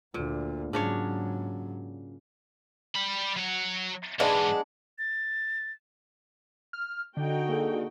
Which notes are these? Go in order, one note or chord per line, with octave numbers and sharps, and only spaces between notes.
D2 A#2
G#2 C#3 F#3 D4 C#5
G3 B5
F#3 F#5
G#2 E3 G#3 B3 D4
A6
F6
D3 D#4 F#4 G5
A#3 G#4 A4